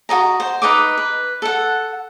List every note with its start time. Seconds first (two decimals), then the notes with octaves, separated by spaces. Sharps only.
0.09 F#4 A4 D#5 A#5
0.40 C5
0.62 D#4 B4 D#5 D6
0.98 B4
1.42 A4 F#5